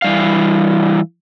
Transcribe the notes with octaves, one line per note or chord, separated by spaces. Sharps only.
E3 G3 F5